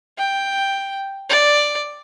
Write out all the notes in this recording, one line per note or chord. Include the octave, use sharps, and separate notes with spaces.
G5
D5